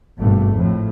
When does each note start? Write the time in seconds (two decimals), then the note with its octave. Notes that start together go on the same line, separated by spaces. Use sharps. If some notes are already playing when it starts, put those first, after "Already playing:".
0.19 G#1 G2 B2 A3
0.54 F2 A2